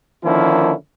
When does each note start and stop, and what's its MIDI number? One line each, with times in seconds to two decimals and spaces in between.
0.24 0.72 50
0.24 0.72 51
0.24 0.72 53
0.24 0.72 58
0.24 0.72 61
0.24 0.72 64